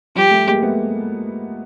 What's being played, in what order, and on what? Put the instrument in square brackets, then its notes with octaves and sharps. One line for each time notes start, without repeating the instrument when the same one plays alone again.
[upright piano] F3 G3 [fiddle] G4
[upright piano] G3 A3
G#3 A#3
A3 B3